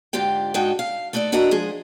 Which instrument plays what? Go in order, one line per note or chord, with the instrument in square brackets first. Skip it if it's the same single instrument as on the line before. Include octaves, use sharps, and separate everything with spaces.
[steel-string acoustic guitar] G#2 D3 F4 G4 G5
G#2 D4 D#4 F#4 G5 A5
F5
A3 D#4 B4 D5 E5
D4 F#4 A#4 D#5 E5 A#5
F3 G#3 G#4